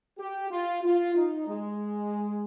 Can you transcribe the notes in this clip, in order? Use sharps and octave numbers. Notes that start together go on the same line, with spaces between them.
G4
F4
F4
D#4
G#3